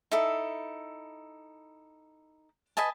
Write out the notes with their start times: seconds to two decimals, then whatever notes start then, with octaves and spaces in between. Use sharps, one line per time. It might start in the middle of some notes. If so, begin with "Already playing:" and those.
0.12 D#4 E4 A4
2.77 B4 D#5 G#5 A5